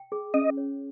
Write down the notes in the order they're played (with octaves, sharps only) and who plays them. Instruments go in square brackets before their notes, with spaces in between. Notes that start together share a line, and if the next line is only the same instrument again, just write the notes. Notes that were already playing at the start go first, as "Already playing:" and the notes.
Already playing: [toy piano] G5
G#4
[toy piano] C#4 [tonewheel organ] D#5
[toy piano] C#5